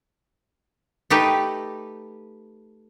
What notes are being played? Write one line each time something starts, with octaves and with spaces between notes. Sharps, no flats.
A3 D#4 G4 B4